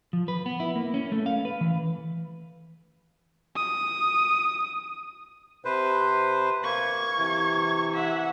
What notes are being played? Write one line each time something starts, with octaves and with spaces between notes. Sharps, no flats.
F3
B4
B3
E4
A#3
C#4
A3
F5
B4
E3
D#6
C3 B4 C5
A#3 C#6 G#6
C3 E3
E5 F#5